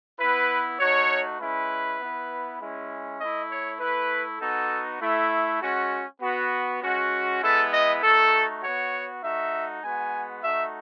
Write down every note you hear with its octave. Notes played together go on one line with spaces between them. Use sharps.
B3 E4 B4
A3 D#4 F#4 C#5
G#3 C#4 E4 B4
B3 E4
G#3 C#4 E4
A3 E4 D#5
C#5
A3 E4 B4
B3 D#4 F#4 A4
A3 E4
G#3 C#4 F#4
B3 F#4
G#3 C#4 F#4
G#3 B3 E4 A4
D#5
A3 D#4 F#4 A4
B3 F#4 C#5
A3 D#4 F#4 E5
G#3 B3 F#4 G#5
A3 D#4 F#4 E5